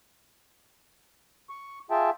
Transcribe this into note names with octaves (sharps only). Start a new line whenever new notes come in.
C#6
F4 G#4 E5 G5 A5